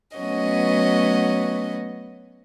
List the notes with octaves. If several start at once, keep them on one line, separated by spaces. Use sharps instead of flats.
F#3 A3 B3 C#4 F#4 D#5